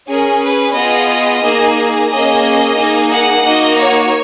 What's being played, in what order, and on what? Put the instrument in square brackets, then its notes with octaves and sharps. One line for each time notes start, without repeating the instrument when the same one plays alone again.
[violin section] C#4 G#4 A#4
B4
B3 F4 G#4 D#5
A#3 D#4 G#4
A#3 C#4 G#4 D#5
A#3 D#4 G#4
F#5
A#3 D#4 F#4 D#5
C#5